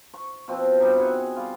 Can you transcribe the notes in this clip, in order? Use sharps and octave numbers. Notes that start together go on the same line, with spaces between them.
C#6
B2 F3 C4
G2 G3 D#4
G#4 E5 F#5 G#5
G3 F4